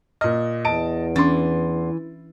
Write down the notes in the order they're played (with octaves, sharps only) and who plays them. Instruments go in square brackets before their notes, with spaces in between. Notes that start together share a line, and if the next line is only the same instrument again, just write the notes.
[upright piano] A#2 D#5 [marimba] F6
[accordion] E2 [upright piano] D#5 A5 D7
[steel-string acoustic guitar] E3 [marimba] C#4 D4 [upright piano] C6 A6